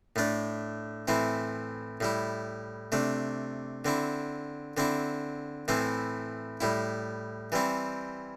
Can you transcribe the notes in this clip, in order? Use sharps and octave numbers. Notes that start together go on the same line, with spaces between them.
A2 A3 D4
A2 E3 C4 E4
A2 G3 E4
C3 A3 D4
D3 C4 E4
D3 C4 E4
A2 E3 C4 E4
A2 G3 E4
E3 G3 C4 E4